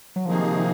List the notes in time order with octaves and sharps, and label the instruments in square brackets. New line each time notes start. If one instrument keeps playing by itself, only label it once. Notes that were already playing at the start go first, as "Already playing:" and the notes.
[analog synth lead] F#3
[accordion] C3 D#3 A#3 D#4 G#4 [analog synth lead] F3
[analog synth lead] F3